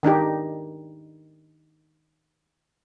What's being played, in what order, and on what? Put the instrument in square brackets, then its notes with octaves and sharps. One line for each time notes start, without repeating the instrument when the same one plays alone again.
[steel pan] D#3 D4 D#4 G4